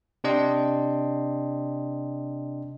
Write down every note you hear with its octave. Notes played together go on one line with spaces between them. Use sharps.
C3 D4 D#5 G5 C6